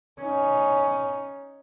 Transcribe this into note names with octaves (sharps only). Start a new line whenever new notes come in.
C#4 D#4